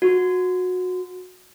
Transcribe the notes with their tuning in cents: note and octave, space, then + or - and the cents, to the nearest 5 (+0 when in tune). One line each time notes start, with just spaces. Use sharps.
F#4 -20